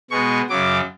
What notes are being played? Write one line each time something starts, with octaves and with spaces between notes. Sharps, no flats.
B2 G#3 B3 C#6
F#2 C#3 F#3 D6